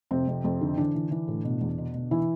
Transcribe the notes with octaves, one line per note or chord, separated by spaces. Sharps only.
F2 C3 C4
F2
F2
D3
D3 E3 D4
E3
E3
A2
B2
E2
B2
B2
E3 E4